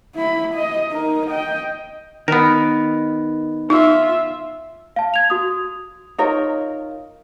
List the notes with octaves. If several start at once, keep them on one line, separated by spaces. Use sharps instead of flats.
E4 B5
D#5
D#4 A#4
D#5 G5
D#3 B3 A#4
D#4 F4 E5
F5 A5
G#6 F7
F#4 D#6
D#4 F4 A#4 C#5